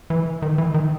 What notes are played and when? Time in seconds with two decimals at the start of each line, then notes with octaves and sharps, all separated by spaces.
0.10 E3
0.42 D#3
0.58 E3
0.74 D#3